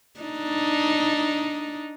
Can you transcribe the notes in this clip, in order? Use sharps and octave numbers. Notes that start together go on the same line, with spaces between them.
D4 D#4